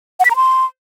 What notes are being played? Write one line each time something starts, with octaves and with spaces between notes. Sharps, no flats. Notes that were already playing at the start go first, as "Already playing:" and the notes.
F#5
B6
A#5
C6